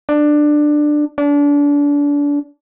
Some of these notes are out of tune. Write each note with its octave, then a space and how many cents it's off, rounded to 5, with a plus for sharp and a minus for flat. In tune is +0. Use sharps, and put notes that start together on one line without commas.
D4 +15
D4 -30